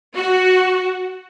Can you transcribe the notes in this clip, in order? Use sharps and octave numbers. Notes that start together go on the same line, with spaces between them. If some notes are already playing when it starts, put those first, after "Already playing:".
F#4